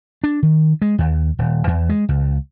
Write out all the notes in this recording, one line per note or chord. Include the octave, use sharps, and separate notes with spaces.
D4
D#3
G#3
D#2
D#1
E2
G#3
C#2